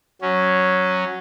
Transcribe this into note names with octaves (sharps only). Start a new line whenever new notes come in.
F#3 C#4